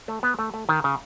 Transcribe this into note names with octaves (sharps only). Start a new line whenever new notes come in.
A3
B3
A3
A3
D#3
C#3